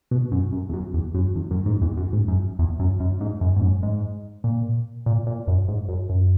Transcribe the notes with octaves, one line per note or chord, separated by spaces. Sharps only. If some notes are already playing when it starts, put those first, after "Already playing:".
B2
F#2
F#2
E2
F#2
E2
F#2
E2
F#2
G#2
E2
F#2
G#2
F#2
E2
F#2
F#2
G#2
F#2
G#2
F#2
G#2
A#2
A#2
A#2
F#2
G#2
F#2
F#2